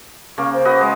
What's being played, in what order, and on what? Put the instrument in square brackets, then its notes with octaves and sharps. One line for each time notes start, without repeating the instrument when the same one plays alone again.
[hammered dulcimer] C#3 A#3 [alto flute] C#6
[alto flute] C5
[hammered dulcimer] F#4 B4 D#5
G#3